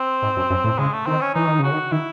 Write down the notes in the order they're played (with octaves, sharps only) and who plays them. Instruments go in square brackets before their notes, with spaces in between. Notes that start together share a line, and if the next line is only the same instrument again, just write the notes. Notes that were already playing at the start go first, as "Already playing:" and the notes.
Already playing: [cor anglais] C4
[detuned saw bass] G#2
F#2
F#2
A2
[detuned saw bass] C#3 [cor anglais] G#3
[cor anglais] A3
[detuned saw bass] D#3 [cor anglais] C4
[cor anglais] C#4
[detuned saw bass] E3 [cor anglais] D#4
[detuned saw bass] D#3
[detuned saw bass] C#3 [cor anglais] F#4
[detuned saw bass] D#3
[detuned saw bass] D#3 [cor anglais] E4